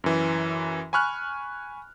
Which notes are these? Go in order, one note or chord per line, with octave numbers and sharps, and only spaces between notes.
F#2 E3
G#5 B5 C#6 F6 F#6